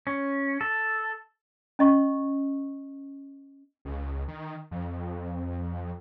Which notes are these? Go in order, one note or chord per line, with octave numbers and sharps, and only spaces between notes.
C#4
A4
C#4 D#5 C#6
C#2
D#3
F2